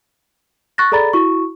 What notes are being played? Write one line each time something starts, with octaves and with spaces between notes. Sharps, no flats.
C#6 F#6 A6 A#6
G#4 A4 D5 A#5 B5 A6
E4 F#4 C#6